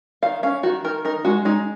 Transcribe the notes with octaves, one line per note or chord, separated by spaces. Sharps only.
D#3 F5
C#4 F5
D#3 F#4
D#3 A#4
D#4 A#4
G#3 F#4
G#3 D#4